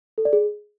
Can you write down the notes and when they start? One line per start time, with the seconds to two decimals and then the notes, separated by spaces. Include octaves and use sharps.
0.18 A4
0.25 D5
0.33 G#4